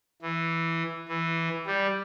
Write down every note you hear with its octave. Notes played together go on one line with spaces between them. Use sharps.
E3
E3
G3